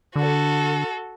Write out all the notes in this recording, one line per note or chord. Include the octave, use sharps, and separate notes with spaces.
D3 F#4 A4